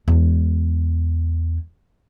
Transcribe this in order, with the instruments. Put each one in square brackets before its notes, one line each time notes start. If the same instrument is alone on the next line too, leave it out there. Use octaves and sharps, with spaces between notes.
[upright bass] E2 G#3